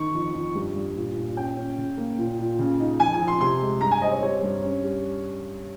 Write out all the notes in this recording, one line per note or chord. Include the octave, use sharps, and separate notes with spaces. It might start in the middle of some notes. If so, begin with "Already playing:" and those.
Already playing: D#3 C#6
F2
F2
G2
G2
A#2
A#2
C#4 G5
C#4
C#3
A#3
A#2
A#2
C#3
D#4
F2 G#5
G#5
F2
C6
C3 C6
G#3
G2 A#5
G#5
C4 D#5
C#5
G3 C#5
G2
C#4
G3